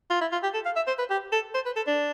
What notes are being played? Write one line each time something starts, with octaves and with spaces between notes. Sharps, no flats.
F4
E4
F4
G4
A4
F5
E5
C5
B4
G4
A4
C5
B4
A4
D4